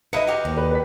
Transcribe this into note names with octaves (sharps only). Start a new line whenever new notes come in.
D#4 E4 B4 D#5 C#7
F#4 G4 A#4
D#2
B4 D5
B4 D5 B6